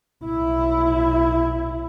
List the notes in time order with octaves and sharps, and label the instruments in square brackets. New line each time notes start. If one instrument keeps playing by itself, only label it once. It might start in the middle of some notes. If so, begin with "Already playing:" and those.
[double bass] B1 E4